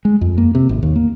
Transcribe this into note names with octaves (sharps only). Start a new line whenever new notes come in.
G#3
F2
A#3
C3
G#1
D#2
A#3